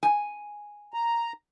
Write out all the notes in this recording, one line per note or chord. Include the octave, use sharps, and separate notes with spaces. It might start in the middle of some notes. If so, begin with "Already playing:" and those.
G#5
A#5